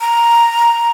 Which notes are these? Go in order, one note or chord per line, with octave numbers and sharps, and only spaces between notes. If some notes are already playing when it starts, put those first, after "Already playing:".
A#5